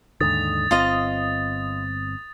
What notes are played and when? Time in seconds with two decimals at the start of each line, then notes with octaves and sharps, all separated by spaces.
0.21 D#2 G#2 D3 D#6 A6
0.71 G1 C4 F4 D#5